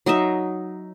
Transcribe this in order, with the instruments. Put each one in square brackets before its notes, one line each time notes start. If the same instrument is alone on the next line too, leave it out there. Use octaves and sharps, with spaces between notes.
[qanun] F#3 D#4 D#5 E5